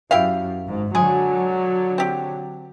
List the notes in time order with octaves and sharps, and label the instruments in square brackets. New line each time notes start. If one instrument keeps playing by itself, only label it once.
[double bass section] F#2 [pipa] E4 G4 F5
[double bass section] G#1 G#2
[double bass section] D3 F#3 [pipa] G#3 G#4
[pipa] C4 G4